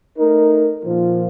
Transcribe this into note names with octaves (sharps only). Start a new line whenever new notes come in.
A3 D#4 A#4
A#2 F3 A#3 F4